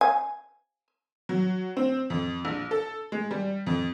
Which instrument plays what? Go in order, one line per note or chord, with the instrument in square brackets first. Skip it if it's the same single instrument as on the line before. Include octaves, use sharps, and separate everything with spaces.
[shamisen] G#5
[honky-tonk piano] F#3
C4
F2
A#1
A4
G#3
G3
F2